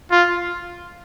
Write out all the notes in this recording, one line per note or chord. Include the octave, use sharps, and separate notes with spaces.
F4